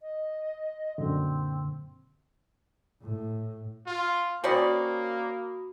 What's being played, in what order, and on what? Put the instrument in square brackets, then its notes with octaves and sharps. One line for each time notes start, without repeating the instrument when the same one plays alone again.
[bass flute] D#5
[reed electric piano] F#2 A#2 D3 [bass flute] C4
[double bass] A2
[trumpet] F4
[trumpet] A#3 [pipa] C4 C#4 D5 [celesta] F#4 B5 D#6